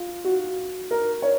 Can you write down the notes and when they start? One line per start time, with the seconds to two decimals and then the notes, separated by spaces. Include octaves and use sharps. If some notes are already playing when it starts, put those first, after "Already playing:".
Already playing: F4
0.24 F#4
0.91 A#4
1.22 C#5